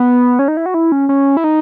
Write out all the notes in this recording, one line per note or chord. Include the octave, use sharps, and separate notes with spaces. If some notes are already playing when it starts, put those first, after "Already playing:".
Already playing: B3
C#4
D#4
E4
F#4
E4
C#4
C#4
E4
D#4